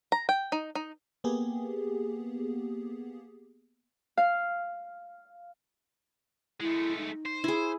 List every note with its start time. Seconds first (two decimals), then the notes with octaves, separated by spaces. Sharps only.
0.12 A#5
0.29 G5
0.52 D#4
0.75 D#4
1.24 A#3 B3 G4 G#4
4.17 F5
6.60 G#3 A3 E4
6.97 D#4
7.25 C5
7.44 E4 G#4